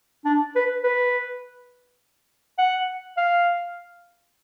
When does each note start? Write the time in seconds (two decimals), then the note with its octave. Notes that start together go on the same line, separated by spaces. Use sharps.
0.25 D4
0.55 B4
0.84 B4
2.58 F#5
3.17 F5